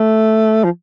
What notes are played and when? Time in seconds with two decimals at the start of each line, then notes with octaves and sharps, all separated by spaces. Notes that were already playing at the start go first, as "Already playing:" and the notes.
Already playing: A3
0.64 F3